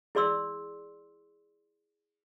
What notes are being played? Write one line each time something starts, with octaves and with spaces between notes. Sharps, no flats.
E4 G#4 D5 C6 E6